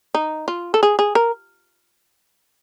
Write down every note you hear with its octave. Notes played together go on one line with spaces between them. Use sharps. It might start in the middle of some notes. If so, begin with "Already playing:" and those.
D#4
F4
A4
G#4
G#4
A#4